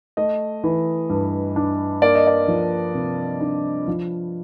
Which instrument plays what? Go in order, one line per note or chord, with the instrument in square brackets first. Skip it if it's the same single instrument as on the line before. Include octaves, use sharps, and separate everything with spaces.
[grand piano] A3 D#5
E3
G2
D4
A#3 D5
D#5
D5
F3
C3
D4
F3